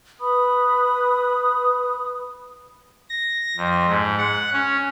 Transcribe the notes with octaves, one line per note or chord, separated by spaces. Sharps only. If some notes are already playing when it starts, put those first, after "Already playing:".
B4 B5 D#6
A#6
F2
G#2
F#5
C#4